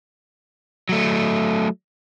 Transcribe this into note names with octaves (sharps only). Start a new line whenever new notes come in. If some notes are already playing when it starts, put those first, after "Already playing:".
F#3 A3